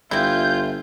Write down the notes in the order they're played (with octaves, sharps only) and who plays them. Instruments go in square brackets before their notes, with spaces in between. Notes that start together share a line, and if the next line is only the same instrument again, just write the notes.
[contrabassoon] G1 [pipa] C3 E4 [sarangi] F4 [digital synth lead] G6